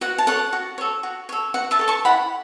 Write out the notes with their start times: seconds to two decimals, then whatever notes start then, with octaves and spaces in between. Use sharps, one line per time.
0.01 F#4 F#5
0.18 A5
0.27 A4 C#5 F#5
0.53 F#4
0.78 A4 C#5
1.03 F#4
1.29 A4 C#5
1.54 F#4 F#5
1.71 E5 A5
1.79 A4 C#5
1.88 A5 C#6
2.05 E4 F#5 B5